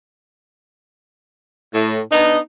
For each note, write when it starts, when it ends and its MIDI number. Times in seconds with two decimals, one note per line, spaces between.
1.74 1.99 45
2.12 2.39 59
2.12 2.39 62
2.12 2.39 63